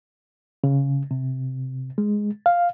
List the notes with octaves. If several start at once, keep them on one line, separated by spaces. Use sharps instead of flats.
C#3
C3
G#3
F5